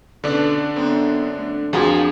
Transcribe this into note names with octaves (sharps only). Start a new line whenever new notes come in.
B2 D3 A3 C#4 D4
F#2 B3 C4
A3
F2 A#2 F3 A#3 D4 F4 F#4 G#4